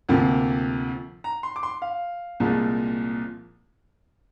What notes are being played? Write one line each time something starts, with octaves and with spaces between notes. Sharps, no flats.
D2 C3 F3 A#3
A#5
C6
D6
C6
F5
C2 A#2 F3 G#3